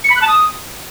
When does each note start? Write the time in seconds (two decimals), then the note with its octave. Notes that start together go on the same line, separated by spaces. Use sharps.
0.04 C#7
0.10 B5
0.16 F#6
0.22 A5
0.28 D#6